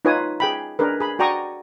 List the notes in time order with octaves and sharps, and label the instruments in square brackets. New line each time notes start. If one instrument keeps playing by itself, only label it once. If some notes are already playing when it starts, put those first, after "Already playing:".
[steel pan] D#4 F4 B4 C#5 G#5 D#6
G#4 G5 B5
D4 G#4 A#4 B4
G#4 B5
F#4 D5 G5 A#5 C#6 D#6